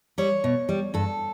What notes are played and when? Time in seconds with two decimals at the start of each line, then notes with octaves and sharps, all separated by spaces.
0.18 G3 C#5
0.44 B2
0.69 G3
0.94 G2 A4